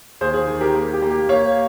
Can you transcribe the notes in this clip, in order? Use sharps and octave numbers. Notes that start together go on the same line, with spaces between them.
D#2 G#4 C5
G#4
D#3
G4 A#4
A#3
G4
A#3
G4
A#3 C#5 F5